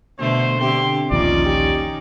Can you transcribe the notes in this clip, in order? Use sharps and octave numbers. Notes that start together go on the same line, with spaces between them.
B2 D3 A3 C5
D3 C4 G4 C6
A#1 D#2 C#4 D#4 F4 D5
G4